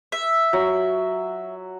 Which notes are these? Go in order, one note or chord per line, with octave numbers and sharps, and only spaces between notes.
E5
F#3